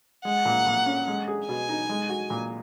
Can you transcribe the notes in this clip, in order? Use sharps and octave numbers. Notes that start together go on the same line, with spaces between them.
G#3 F#5
A#2
A#2
C#4
G#3
G#4
B2 G#5
D#4
G#3
F#4
A#2